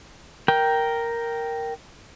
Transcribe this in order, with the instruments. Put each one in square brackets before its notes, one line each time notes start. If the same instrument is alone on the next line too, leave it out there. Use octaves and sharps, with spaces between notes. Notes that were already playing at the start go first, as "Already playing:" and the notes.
[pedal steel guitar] A#4 G5